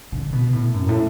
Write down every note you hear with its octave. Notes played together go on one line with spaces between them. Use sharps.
D3
B2
A2
F#2
A2